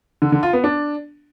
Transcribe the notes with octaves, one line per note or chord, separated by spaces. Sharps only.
D3
D3
F4
B3
D4